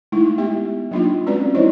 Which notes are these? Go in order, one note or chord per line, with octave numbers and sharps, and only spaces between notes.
G#3 A3 D#4 E4
B3 G4 E5
F#3 A#3 D4 D#4 F4
G#3 C4 C#4 F#4 B4 D5
F3 D#4 E4 C5 C#5 D#5